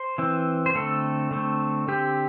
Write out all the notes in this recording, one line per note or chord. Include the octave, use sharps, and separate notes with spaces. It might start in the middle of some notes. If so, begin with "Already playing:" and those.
Already playing: C5
E3 C4
C5
D3 A3 C4 A4
D3 A3 C4
D3 C4 G4